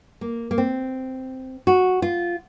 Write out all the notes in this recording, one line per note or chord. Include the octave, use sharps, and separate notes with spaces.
A#3
A#3
C4
F#4
F4